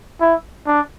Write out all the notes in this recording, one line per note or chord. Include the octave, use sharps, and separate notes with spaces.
E4
D4